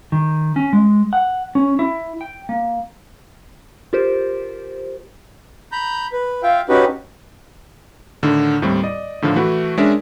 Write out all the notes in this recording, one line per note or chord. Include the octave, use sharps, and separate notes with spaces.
D#3
C#4
G#3
F#5
C#4
E4
G5
A#3
F4 G4 A#4 C5
A#5 B5 G6
B4
F4 E5 F5 G5
C#4 D#4 F#4 G4 B4
A2 D3 D#3
D#2 A2 D#3 G3 C4
D5 D#5
A2 D3 D#3 F3
E3 A3 E4 F#4
G#3 C#4 D4 A#4 E5